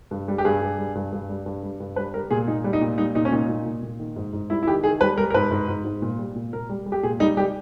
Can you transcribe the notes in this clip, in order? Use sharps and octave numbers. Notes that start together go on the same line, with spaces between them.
G2
G3
G4
G2 G#4
G2
G3
G2
G2
G3
G2
G3
G2
G3 B4
G3 A#4
A#2 G#4
A#2 D#4
G3
D#4
A#2
G3 D#4
A#2 D#4
C#4
A#2 D#4
A#2
A#2
A#2
D#3
G#2
G#2
G3 E4
E4
D#3 G4
D#3 G#4
G3 B4
G3 A#4
A#4
G#2 B4
G#2
G#2
G#2
A#2
G3
A#2
A#2 A#4
G3
G3
G4
A#2 G#4
G3 D#4
G3 G4